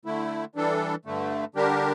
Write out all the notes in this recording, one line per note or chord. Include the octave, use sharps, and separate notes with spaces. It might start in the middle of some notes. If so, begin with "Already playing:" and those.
D3 A3 E4
E3 G3 D4 A4
G2 D3 A3
D3 G3 D4 G4 A#4